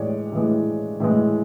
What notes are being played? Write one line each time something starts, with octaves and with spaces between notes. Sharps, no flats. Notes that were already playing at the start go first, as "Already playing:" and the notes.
Already playing: A2 E3 G#3 C#5 D5
A2 E3 G#3
A2 E3 G#3